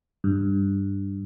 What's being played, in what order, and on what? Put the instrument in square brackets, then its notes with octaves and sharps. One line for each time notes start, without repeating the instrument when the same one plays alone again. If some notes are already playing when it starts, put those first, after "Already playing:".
[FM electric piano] G2